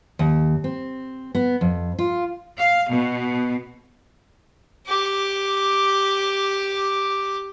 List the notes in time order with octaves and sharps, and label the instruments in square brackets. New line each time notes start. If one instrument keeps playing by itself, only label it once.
[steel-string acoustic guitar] D#2
C4
B3
F2
F4
[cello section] F5
B2
[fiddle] G4 D6